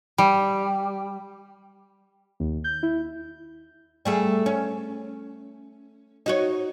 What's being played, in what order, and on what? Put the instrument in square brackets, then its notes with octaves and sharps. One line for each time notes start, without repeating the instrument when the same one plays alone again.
[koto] G3
[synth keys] D#2
G6
E4
[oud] G3 A3 G#4
C#4
D#4 F#4 C#5